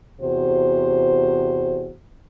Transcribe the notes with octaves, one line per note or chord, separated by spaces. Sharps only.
E2 C3 F#4 C5